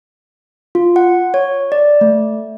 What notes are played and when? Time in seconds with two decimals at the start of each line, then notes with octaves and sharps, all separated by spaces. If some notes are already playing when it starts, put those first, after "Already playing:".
0.75 F4
0.96 F#5
1.34 C#5
1.72 D5
2.01 A3